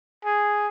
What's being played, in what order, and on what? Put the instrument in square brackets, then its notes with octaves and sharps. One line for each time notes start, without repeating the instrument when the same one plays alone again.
[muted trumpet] G#4